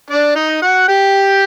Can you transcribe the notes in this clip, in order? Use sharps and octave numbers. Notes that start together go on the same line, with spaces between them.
D4 D5
D#4 D#5
F#4 F#5
G4 G5